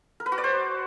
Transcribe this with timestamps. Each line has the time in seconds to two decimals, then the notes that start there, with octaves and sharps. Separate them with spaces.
0.20 A#4
0.26 B4
0.32 F#4
0.38 D5
0.44 C5